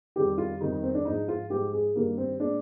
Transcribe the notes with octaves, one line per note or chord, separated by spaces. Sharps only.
F2 D#3 G3 G4
F4
F2 D#3 G3 D#4
D#4
C4
D4
G#2 F3 G#3 D#4
F4
G#2 F3 G#3 G4
G#4
G2 D#3 G3 A#3
C4
A#2 G#3 D4